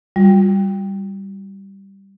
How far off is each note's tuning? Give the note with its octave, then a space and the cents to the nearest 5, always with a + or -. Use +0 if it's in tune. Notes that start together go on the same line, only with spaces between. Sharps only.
G3 +0 F4 +45